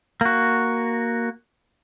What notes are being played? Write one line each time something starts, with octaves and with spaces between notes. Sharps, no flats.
A#3 F#4